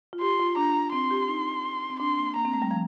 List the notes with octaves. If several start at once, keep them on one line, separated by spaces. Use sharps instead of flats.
F4
G4 C6
F4
D4 A#5
C4 C6
G4
D#4
C4
D4 C6
A#3
A#3 A#5
C4
A3
G3
F3